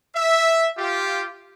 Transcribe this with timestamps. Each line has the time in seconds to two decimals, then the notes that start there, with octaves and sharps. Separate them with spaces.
0.16 E5
0.78 F4 G4